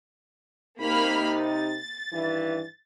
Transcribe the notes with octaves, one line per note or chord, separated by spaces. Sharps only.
C3 A#3 D#4 B5 F6
A6
G2 D#3 E3